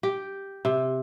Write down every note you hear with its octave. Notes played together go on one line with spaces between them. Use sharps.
G4
C3